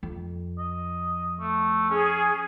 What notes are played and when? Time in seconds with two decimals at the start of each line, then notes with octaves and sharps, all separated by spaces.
0.03 F2
0.59 D#5
1.40 A3
1.90 C#4 G#4